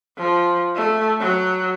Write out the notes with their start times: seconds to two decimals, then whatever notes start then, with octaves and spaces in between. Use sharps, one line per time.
0.18 F3
0.75 A3
1.20 F#3